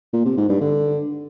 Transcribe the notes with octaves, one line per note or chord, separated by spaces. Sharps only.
A#2
C3
G#2
G2
D3